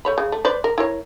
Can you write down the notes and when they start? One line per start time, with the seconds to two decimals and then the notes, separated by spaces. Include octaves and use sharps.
0.05 A3 C#5 B5
0.18 C#3
0.32 A3
0.45 B4 C5 D5
0.64 A#4
0.78 E4 A#4 C#5